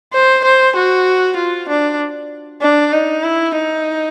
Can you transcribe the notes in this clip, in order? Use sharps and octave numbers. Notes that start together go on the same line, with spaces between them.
C5
C5
F#4
F4
D4
D4
D#4
E4
D#4